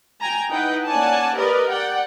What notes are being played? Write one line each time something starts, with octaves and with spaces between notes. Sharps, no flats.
G5 G#5 A#5
D#4 E4 B4 D#5 F#5 G5
A#3 C#4 D5 F#5 G#5 A5
G4 A#4 B4 D5 D#5
D5 F#5 G5